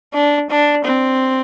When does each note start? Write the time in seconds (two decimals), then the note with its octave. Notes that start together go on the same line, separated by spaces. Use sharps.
0.14 D4
0.50 D4
0.85 C4